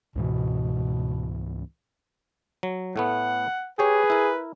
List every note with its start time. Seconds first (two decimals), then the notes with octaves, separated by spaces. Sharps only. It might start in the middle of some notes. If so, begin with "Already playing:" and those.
0.16 C#2 G#2 B2 E3
2.63 F#3
2.96 A2 A3 B3 F#5
3.79 G4 G#4 B4 C#5
4.10 E4 A#4